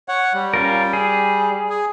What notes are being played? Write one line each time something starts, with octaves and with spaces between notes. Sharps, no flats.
C#5 F#5
G3
C#4 F4 A#4
G#4
G#4